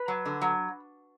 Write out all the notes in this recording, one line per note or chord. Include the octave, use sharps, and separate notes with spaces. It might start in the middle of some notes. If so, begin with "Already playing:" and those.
Already playing: B4
F#3
D3
F#3